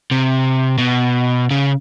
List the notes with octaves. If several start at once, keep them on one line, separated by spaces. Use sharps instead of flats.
C3
B2
C#3